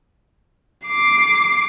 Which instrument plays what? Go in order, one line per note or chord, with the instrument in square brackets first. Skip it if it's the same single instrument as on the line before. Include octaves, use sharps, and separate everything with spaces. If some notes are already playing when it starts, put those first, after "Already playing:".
[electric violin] D6 C7